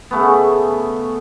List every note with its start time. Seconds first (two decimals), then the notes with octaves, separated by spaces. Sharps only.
0.11 C#3 A3 B3